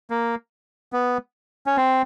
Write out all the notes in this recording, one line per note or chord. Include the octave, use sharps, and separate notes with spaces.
A#3
B3
C#4
C4